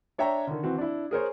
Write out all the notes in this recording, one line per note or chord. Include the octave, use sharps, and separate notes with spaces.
D4 C#5 E5 G5 A#5
D3 D#3
E3 C4 F#4
D4 E4
G#4 A#4 C5 C#5